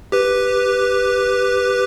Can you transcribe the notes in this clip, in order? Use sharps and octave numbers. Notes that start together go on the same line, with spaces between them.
G4 B4